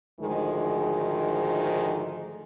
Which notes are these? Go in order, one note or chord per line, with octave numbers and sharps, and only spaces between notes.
D2 G#2 D#3 F3 G#3